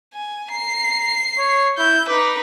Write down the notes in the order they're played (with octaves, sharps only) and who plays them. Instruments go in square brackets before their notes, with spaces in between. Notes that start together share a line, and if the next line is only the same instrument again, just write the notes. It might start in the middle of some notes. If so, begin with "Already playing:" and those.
[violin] G#5
[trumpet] A#5 [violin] C7
[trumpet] C#5
[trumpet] E4 [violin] G6
[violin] D#4 B4 [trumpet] D6